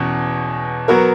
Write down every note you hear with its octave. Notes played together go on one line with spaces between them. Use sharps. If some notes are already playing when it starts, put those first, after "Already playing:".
Already playing: E2 B2 C#4
F#3 B3 F#4 A#4